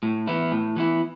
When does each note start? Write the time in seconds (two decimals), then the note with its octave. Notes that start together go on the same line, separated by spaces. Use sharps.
0.03 A2
0.27 E3 B3 E4
0.52 A2
0.76 E3 B3 E4